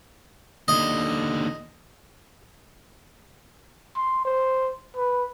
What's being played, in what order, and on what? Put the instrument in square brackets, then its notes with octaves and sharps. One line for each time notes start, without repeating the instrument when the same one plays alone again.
[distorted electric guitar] D#2 D3 [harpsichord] D#5
[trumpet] C6
C5
B4